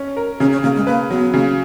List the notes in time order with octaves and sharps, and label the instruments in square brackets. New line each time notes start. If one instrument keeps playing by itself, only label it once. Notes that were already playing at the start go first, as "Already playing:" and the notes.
Already playing: [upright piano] C#4
A#4
[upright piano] C#3 [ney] C#4
[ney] C#4
[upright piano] C#3 [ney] A#3
[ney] G#3
[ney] A#3 [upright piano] B4
[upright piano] F#3 [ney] B3
[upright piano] C#3 [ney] A#3